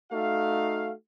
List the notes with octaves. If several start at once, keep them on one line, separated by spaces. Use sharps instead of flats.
A3 D#4 F#4 F5